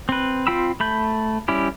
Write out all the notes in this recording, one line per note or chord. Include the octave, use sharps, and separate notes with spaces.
C4 B4
C4 F4 G5 B5 E6
A3 B5 G6
G3 C#4 E4 G4